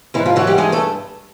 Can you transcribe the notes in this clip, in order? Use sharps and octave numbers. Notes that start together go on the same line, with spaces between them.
G#2 E3 E4
F3 F4
E3 F#3 F#4
G3 G4
G2 G#3 G#4
A3 A4